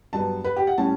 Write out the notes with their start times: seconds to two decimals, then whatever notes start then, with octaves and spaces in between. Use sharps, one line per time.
0.13 G2 F#3 B3 A5
0.44 B4
0.56 G4
0.67 F#5
0.78 A2 G3 C#4 A5